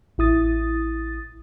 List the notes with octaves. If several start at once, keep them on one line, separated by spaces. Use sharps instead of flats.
A1 E4 D#6 A6